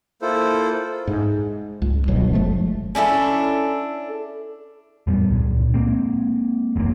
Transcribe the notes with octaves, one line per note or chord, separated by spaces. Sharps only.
A#3 E4 F4 A4 C5
G#2
C#2
D1 G1 B2 F#3
F#1 F3 G#3 A3
C#4 D4 E4 A4
E2 A2 G3 B3
C#2 A#2
G#3 A#3 C4
F#1 E2 G#2 A#3